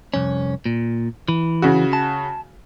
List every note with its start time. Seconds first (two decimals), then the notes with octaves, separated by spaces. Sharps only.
0.14 C2 F2 C#4
0.66 A#2
1.28 E3
1.62 C#3 F#4
1.93 A5